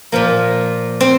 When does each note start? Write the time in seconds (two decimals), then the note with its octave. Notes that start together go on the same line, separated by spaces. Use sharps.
0.12 A#2 F3 A#3
1.01 C4